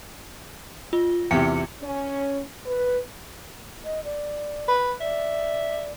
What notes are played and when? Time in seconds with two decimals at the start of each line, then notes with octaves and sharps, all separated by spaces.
0.93 F4
1.31 E2 C3 G4 C#7
1.81 C#4
2.66 B4
3.85 D#5
4.05 D5
4.68 B4
5.01 D5 E5